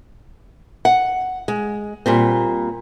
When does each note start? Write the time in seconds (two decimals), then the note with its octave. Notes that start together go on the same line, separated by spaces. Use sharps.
0.85 F#5
1.48 G#3
2.06 A#2 G3 C4